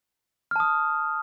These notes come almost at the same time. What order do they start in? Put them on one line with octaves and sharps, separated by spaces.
F6 A5 D#6